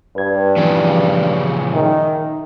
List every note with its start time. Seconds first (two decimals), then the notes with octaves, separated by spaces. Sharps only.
0.16 G2 B4 G#6
0.57 A#2 C#3 E3 F3
1.74 D#3 E5